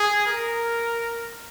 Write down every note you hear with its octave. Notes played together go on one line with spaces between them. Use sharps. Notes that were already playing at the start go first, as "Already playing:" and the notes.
Already playing: G#4
A#4